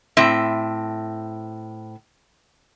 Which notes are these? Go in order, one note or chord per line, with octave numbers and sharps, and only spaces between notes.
A2 C4 E5